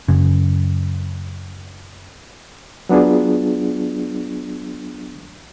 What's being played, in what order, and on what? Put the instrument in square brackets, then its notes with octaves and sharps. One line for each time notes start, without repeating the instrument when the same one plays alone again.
[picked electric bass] F#2 C#3
[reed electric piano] F#3 B3 D4 F4 G#4